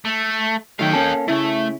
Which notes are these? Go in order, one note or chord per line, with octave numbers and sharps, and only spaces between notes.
A3
D#3 F#3 A3 F5 G5
A#3 C#4 A4
C#3 A3 E4